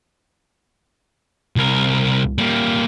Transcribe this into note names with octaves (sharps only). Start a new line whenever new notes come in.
C2 A#4
G3 A#3